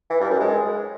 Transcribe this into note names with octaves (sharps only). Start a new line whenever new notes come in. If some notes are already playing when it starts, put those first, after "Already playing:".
E3
G2
F#2
G#3